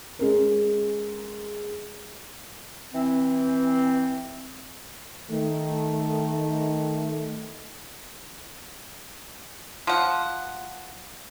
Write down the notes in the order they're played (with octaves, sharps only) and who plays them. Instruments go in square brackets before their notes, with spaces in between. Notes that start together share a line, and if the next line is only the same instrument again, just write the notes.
[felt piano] G#3 C#4 A#4
[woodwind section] E3 C4
[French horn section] D#3 A3
[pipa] F3 F#5